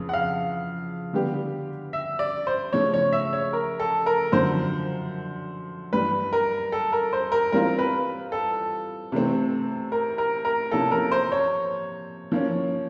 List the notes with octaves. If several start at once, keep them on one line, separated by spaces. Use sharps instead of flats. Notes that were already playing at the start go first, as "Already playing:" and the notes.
Already playing: F2 C#3 E3
F#5
F5
D3 G3 B3 D4 G4
E5
D5
C5
C#3 F3 A3 C#5
C#5
E5
C#5
A#4
A4
A#4
F#2 D3 F3 C5
G2 E3 G3 B4
A#4
A4
A#4
C5
A#4
E3 G3 C4 F4 A#4
B4
A4
C3 E3 A3 C4
A#4
A#4
A#4
C3 F3 A#3 C#4 E4 A4
A#4
C5
C#5
F3 A#3 C#4